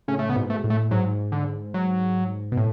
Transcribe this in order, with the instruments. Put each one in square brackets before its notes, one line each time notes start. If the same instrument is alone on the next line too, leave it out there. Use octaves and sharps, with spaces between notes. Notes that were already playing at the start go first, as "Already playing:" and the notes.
[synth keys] A2 C#3 [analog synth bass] C#4
[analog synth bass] A3
[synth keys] C#3 [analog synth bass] B3
[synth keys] G#2 B2
[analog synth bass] A3
[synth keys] A2
[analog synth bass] A3
[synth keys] G#2 [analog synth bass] F#3
[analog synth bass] D3
F#3
[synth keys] B2
A2